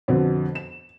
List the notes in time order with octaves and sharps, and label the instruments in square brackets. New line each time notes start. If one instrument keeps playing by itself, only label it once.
[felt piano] F2 B2 D3
E7